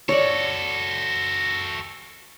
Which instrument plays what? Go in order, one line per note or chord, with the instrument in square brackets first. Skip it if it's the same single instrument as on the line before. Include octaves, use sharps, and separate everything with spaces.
[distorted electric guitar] F#4 A4 [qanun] C#5 D5